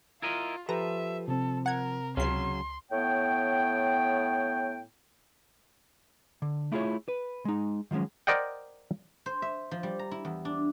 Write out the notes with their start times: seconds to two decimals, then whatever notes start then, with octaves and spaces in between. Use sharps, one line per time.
0.22 E4 F4 A#4 D#5
0.69 F3 G4 A4 B4 E5 A#5
1.28 C3 C4 A4
1.66 A#4 F#5 G#6
2.17 C#2 C#3 F#3 C#4 C6 C7
2.92 A2 B3 C#5 G5
6.42 D3
6.72 A3 E4 F4 G#4 A4 C#5
7.08 B4
7.45 G#3 D#4
7.91 D#3 F3 F#3 G#3 C#4
8.27 A#4 C5 D5 D#5 F#5 G5
9.26 C5
9.42 E5
9.71 F3
9.83 G3
9.99 A#5
10.11 E4
10.25 E2
10.45 D4